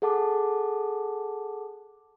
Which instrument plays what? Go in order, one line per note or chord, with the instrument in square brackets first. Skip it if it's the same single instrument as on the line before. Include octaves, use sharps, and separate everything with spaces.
[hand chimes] G#4 A4 F#5 A5 D6